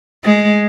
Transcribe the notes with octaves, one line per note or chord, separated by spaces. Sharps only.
G#3